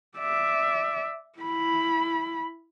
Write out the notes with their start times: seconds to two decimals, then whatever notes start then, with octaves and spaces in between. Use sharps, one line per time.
0.18 D5 E5
1.39 E4 B5